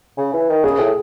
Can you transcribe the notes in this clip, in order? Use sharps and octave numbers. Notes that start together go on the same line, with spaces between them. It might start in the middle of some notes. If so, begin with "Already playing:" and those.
C#3
E3
D#3
C#3 G#4
A2